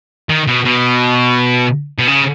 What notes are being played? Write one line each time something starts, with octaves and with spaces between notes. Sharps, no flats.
D#3
B2
B2
B2
C#3